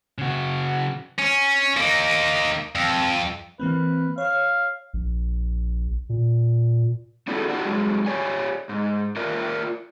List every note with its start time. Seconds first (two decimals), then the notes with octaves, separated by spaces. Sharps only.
0.18 C#3 F#4
1.19 C#4
1.77 A#3 D#4
2.75 F2
3.60 E3 A#3 C4 B4
4.18 C#5 F5
4.94 A#1
6.09 A#2
7.28 A#3 D4 E4 F#4 G#4 A4
7.49 D4 E4 F#4 G4
7.65 G2 F#3 G#3
8.06 G4 C#5 D5 G#5
8.69 G#2
9.16 F4 A#4 D5 E5